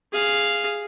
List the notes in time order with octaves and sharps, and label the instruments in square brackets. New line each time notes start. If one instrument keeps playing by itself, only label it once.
[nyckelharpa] G#4 F5